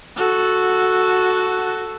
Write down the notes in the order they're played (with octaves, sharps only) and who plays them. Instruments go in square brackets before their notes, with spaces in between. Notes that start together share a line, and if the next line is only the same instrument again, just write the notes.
[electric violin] F#4 A4